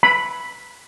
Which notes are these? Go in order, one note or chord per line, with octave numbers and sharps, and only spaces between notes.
B5